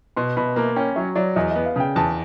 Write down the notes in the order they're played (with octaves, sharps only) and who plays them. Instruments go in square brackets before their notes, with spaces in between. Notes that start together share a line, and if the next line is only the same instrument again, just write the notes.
[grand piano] B2 [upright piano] C6
[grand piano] B2 [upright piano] B5
[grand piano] A#3 [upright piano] A#5
[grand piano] C#4 [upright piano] G5
[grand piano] F#3 [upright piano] C#5
[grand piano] F#3 [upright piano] D5
[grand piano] E2 [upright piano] D#5
[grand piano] B3 [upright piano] D#5
[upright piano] F5
[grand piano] C#3 [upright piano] G5
[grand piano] E2 [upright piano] A5